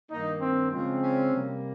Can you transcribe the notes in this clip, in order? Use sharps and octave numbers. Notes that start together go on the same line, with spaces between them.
G2 D#3 A#3 D#4
C4
C#3 F3 G#3 C4
C#4
C3 G3 A#3